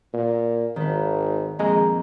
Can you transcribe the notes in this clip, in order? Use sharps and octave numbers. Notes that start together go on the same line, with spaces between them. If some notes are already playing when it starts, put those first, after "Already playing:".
A#2
G#1 D#3 B4
F2 A#2 G#3 A#5